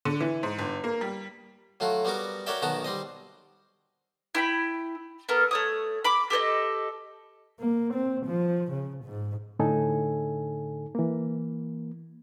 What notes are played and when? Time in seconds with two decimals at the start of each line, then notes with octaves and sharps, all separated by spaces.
0.05 D3
0.21 E3
0.43 G#2
0.59 G1
0.84 A#3
1.01 G3
1.80 F#3 A3 F4 F#4
2.05 G3 B3 F#4 A#4 D6
2.47 F#4 A#4 C#5 D5 E5 G5
2.62 B1 D#3 B3 F#4 A5 A#5
2.84 G3 C4 D#5
4.35 E4 G5 B5
5.29 B3 A4 A#4
5.51 A3 C#5 D#6
6.04 B5 D6
6.30 G4 A4 C5 D#5
7.60 A#3
7.94 C4
8.26 F3
8.72 C#3
9.04 G#2
9.59 A2 D3 D#4 A4 G#5
10.95 E3 A#3